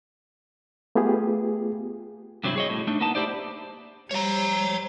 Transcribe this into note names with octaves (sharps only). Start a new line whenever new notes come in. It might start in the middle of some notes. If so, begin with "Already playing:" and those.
A3 B3 F4 G4 G#4
G2 C3 F#3 C4 E4
G#4 C#5 D#5
A2
A3 D4 D#4
A#3 B3 D#4 A5
E4 G4 C5 D5
G3 C5 C#5 A#5